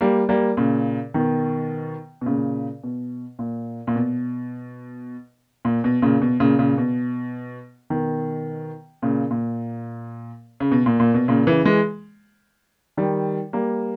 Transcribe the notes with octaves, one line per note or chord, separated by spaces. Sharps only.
G3 A#3
G3 A#3
A#2 C#3
B2 D#3
B2
A#2 C#3
B2
A#2
A#2
B2
A#2
B2
A#2 C#3
B2
A#2 C#3
A#2 C#3
B2
B2 D#3
A#2 C#3
A#2
C#3
B2
A#2
A#2
B2
A#2 C#3
C#3 E3
E3 G#3
D#3 G3
G3 A#3